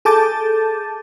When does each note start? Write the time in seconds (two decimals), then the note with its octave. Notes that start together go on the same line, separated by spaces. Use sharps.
0.05 G#4 A4 A5 D6 G6 A6